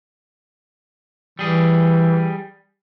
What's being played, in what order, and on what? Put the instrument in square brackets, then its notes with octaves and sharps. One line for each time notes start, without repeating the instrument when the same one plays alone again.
[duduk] E3 [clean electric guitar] G3 G#4